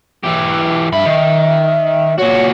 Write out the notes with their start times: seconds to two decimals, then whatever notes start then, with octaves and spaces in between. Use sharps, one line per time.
0.24 E3 G4
0.93 G2 E5 B5
1.06 D#3
2.19 A#2 F#4 C#5